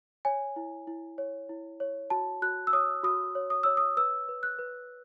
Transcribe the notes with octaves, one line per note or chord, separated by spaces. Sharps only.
C#5 G#5
E4
E4
C#5
E4
C#5
F#4 A5
F#4 F#6
E6
C#5 D#6
F#4 D#6
C#5
D#6
C#5 E6
D#6
B4 E6
B4
F#6
B4